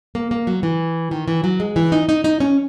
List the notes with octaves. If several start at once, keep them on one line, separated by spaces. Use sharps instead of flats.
A#3
A#3
F#3
E3
D#3
E3
F#3
G#3
E3
D#4
D#4
D#4
C#4